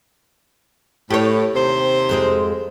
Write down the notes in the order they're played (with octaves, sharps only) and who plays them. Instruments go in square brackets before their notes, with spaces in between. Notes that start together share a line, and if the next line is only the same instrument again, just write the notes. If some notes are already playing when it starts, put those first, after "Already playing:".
[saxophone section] A2 [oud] G4 C#5
[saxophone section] D#2 C3 C5
[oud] F2 G#3 C4